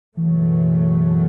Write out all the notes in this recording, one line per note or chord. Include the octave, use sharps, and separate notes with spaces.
F#1 E2 B2 E3 F#3 A3